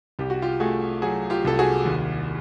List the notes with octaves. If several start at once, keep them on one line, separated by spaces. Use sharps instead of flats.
C2 G4
F#4
F4 G4
A3 F#4 G#4
F#3 F#4 G#4
F4 G4
C2 A4
F#4 G#4
D#2